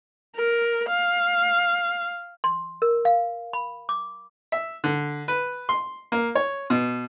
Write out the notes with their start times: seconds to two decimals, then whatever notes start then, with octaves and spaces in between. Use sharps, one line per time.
0.36 A#4
0.89 F5
2.44 C6
2.82 A#4
3.05 F5
3.53 B5
3.89 D6
4.52 E5
4.84 D3
5.28 B4
5.69 C6
6.12 A#3
6.35 C#5
6.70 B2